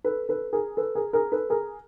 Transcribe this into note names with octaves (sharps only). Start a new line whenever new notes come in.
A4 B4
A4 B4
G#4 A#4
A4 B4
G#4 A#4
G#4 A#4
A4 B4
G#4 A#4